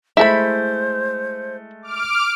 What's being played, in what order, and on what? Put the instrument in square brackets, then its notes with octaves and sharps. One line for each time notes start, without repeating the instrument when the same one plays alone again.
[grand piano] G#3 A3 [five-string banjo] E4 A5 B5 [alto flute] C5
[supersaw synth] D6 F6 D7